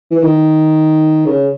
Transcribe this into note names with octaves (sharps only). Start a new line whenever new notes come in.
E3
D#3
C#3